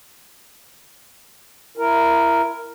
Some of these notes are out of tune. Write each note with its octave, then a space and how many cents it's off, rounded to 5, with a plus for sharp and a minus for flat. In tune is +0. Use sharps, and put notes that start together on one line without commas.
E4 +20 A#4 +0